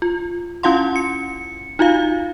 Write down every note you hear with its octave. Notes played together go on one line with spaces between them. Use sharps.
F4
C#4 E4 F4 F5 F#5 C6
C#7
D#4 F4 F#4 F5